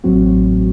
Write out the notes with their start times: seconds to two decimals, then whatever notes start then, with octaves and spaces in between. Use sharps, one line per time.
0.04 A1 A2 F#3 C4 F#4